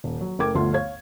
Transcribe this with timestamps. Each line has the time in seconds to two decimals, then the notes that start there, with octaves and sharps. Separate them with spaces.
0.04 D#1
0.21 F#3
0.39 F#1 A3 A#4 G5 D6 G#6
0.54 G1 D2 F3 A3 F4 C6
0.74 C#5 F5 G#6